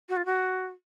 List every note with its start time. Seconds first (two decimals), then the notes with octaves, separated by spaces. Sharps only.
0.09 F#4
0.17 F4
0.25 F#4